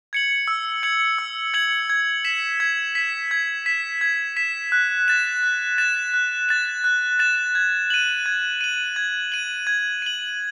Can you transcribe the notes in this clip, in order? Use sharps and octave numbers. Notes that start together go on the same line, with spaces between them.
G#6 C#7 F#7
E6
G#6 C#7 F#7
E6
G#6 C#7 F#7
G#6
B6 E7
G#6
B6 E7
G#6
B6 E7
G#6
B6 E7
F#6
A6 E7
F#6
A6 E7
F#6
A6 E7
F#6
A6 E7
G#6
D#7 F#7
G#6
D#7 F#7
G#6
D#7 F#7
G#6
D#7 F#7